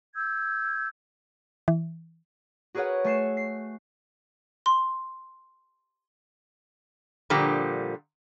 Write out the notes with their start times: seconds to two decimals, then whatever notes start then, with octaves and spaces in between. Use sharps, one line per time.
0.16 E6 G6 G#6
1.68 E3
2.74 F#4 G#4 A#4 B4 C#5 F#5
3.04 A3 G#5 C#6 C7 C#7 E7
3.37 C7
4.66 C6
7.30 A#2 D3 F3 G3